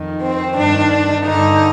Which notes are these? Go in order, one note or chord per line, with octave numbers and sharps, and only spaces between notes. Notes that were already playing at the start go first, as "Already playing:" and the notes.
Already playing: F2 D#3
C4
G2 D#3 D4
G2 D3 D#4